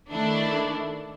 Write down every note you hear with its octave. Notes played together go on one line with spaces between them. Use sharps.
D#3 A3 D4 E4